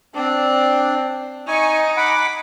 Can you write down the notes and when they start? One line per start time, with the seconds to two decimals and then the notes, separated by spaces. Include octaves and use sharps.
0.15 C4 D4
1.48 D#4 G#5 C#6
1.97 F#5 B5 D6